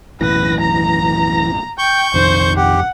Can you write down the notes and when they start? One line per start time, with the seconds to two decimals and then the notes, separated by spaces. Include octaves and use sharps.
0.21 B1 F#2 A2 E3 B4 A#6
0.60 A#5
1.78 G5 C#6 G6
2.14 A#1 F2 C3 D#3 C5
2.56 G4 F#5